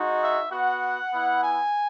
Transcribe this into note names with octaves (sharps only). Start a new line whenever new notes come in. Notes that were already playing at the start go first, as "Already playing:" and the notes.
Already playing: G#3 D#4 F#4
E5
B3 F#4 F#5
B3 E4
G#5